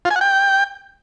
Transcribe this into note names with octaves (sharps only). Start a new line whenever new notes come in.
F4
G#5
F#5
G5